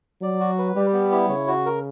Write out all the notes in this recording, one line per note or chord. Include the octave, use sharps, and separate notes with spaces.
F#3 D5
F#4
B4
G3 G4
B3
E4
C#3 C#5
F#4
A#4